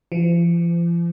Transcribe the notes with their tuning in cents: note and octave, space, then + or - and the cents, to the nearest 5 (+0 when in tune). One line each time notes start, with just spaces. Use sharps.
F3 -40